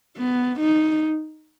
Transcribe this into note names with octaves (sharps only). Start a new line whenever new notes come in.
B3
D#4